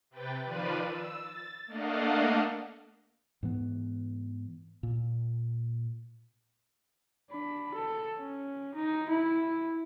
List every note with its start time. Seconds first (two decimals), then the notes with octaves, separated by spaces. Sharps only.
0.11 C3 B4 G5 A6
0.43 D#3 F3 F4 B4 D5 D#7
0.84 E6
1.19 A6
1.67 A3 A#3 D4 D#5 F5 F#5
3.43 G#2 E3 B3
4.83 A#2
7.30 D4 B5
7.74 A4
8.18 C#4
8.75 D#4
9.09 E4